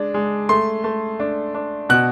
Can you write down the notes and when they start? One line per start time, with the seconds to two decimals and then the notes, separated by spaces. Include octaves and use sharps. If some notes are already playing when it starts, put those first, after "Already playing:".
Already playing: G#3 D4
0.14 G#3
0.49 A3 C6
0.84 A3
1.20 D4
1.55 D4
1.89 B2 F#6